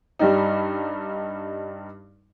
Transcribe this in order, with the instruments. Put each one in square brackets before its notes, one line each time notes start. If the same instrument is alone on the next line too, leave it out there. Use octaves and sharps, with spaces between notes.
[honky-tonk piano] G2 G3 D#4